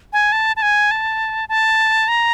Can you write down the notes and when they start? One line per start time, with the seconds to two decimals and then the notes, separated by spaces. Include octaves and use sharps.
0.13 G#5
0.32 A5
0.56 A5
0.62 G#5
0.91 A5
1.49 A5
2.08 A#5